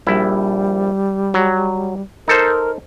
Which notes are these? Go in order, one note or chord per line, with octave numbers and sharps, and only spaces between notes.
A#1 G3 E4
F#3
D#4 A4 A#4 C5